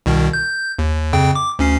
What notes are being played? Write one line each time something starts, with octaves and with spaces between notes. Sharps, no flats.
C2 B2 D#3
G6
D#2
F2 C#3 G5
D6
D2 C#4 C7